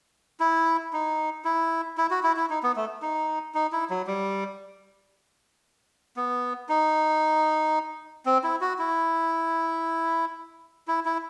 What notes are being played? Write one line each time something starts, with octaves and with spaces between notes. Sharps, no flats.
E4
D#4
E4
E4
F#4
E4
E4
D#4
B3
A3
D#4
D#4
E4
F#3
G3
B3
D#4
C4
E4
F#4
E4
E4
E4